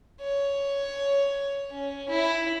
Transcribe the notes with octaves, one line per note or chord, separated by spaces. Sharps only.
C#5
C#4
E4